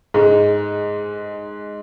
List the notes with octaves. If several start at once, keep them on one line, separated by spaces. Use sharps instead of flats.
G#2 G#3